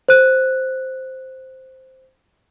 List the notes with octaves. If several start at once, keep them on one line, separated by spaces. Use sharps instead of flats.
C5 F#6